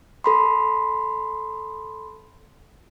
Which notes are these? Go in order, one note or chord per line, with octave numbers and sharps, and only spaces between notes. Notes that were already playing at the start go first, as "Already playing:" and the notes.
A4 B5 C6